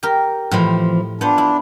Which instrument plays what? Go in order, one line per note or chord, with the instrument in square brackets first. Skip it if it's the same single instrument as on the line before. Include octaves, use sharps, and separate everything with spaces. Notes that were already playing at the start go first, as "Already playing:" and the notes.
[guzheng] G4 A#4
[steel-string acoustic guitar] F2 E3 F3 [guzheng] A2
[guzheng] B3 C5 [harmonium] D4 [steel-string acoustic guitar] F4
[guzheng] E4